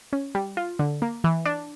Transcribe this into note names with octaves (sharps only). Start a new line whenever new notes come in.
C#4
G3
F4
D3
A#3
E3
D4